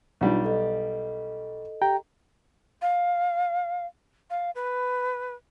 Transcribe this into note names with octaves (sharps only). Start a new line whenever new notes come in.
B1 G3 D4 D#4 F4
A4 D#5
G4 G5 A#5
F5
F5
B4